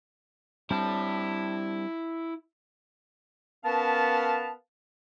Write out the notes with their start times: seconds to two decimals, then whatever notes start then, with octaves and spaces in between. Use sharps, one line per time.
0.70 G3 C4 D4 E4 A5
3.64 B3 C#4 A#4 B4 F5 A5